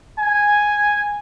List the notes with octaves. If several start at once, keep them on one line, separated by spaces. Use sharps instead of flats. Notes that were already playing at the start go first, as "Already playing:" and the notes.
G#5